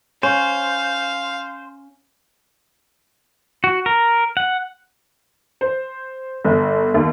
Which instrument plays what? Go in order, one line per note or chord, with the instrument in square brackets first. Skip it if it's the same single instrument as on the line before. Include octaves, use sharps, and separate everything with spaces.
[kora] C#4 [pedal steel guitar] C5 [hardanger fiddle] F5
[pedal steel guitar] F#4
A#4
F#5
[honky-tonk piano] C5
G1
D#2